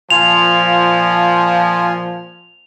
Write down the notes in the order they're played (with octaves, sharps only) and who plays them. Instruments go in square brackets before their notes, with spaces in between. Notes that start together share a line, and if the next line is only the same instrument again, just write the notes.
[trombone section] A#2 F3 [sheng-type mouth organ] F4 G#5 C6 [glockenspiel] F7